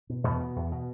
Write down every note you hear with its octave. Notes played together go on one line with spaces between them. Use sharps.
B2
E2 B2 B3
B2
E2
B2